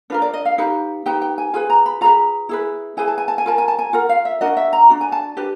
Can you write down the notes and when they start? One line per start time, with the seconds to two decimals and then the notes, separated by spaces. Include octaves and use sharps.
0.10 D4 F4 A#4 B4
0.22 D5
0.34 D#5
0.45 F5
0.58 D#4 G4 B4
1.06 D#4 G4 B4 G5
1.22 G5
1.38 G#5
1.54 F4 G#4 B4 G#5
1.70 A#5
1.86 B5
2.01 F4 G#4 B4 A#5
2.49 E4 G#4 B4
2.97 E4 G#4 B4 G#5
3.08 A5
3.18 G#5
3.28 A5
3.38 G#5
3.46 F4 A#4 A5
3.58 G#5
3.68 A5
3.79 G#5
3.93 F4 A#4 F#5
4.09 F5
4.25 E5
4.41 D4 F#4 A#4 D#5
4.57 E5
4.73 A#5
4.90 D4 F#4
5.01 G#5
5.12 A5
5.37 D4 G4 B4